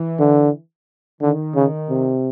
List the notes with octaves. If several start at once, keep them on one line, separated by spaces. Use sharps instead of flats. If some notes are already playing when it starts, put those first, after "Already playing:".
Already playing: E3
D3
D3 D#3
C#3
C3